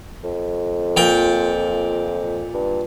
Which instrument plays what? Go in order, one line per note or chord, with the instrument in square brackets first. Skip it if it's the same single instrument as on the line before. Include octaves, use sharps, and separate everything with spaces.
[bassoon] F2
[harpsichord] A#2 G5
[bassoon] G2